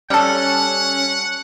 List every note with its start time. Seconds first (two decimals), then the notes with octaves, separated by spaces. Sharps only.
0.10 G3 C#4 A4 F#5